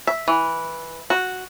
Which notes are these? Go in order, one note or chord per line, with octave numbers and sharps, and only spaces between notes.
E5
E3
F#4